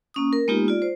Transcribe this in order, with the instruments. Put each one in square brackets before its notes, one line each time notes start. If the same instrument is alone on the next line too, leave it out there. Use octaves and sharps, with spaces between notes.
[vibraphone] A#3 C#4 D#6
A#4
G#3 A#3 B3 D#4 F4 G4
F4 D5
C5